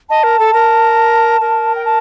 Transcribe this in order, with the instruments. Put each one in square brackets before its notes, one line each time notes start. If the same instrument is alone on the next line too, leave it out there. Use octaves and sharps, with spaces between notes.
[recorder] D#5 [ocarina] A5
[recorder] A#4
A4
A#4
A#4
[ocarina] G5
A5